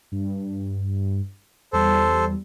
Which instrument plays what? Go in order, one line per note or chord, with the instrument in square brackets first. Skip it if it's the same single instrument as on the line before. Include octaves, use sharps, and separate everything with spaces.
[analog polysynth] G2
[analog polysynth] E2 G3 [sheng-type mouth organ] A4 C5